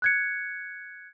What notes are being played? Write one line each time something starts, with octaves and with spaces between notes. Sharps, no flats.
F#6 G#6 C#7